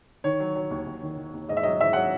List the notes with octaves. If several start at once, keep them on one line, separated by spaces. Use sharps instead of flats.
D#3 C#5
F#3
F#3
D#2
D#2
D#3
D#3
D#2
G#2 D#5
E5
F#3 D#5
G#2 E5
F#3 F#5